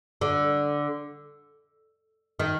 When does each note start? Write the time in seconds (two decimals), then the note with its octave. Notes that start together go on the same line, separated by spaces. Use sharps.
0.21 D3
2.39 D#3